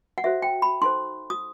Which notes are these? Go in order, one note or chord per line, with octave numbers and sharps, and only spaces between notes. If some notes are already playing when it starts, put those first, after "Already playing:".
F#5
F#4 A4 C5 E5
G5
B5
D#4 A4 C5 C6
D#6